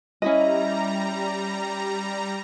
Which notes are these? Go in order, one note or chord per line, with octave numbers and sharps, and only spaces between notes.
G3 C#4 E4 D#5 A#5